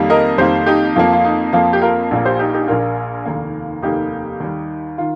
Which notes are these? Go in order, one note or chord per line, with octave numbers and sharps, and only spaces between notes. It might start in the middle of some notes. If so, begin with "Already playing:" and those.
Already playing: F2 D#3 G3 A#3
A#4 D#5
F2 D#3 G3 A#3 G4 C5
D#4 G4
F2 F3 A#3 F4
F4
D#4
F2 F3 A#3 F4
G4
F4 A#4
A#1 A#2 A#3
G4 C5
D#4 G4
D#4 G4
A#1 A#2 A#3 F4 A#4
F1 D#2 D#3 A#3
F1 D#2 D#3 A#3 D#4 G4
D#2 D#3 G3
D#3 F4